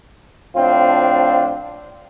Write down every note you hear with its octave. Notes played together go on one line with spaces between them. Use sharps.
A2 F3 C4 D4 F4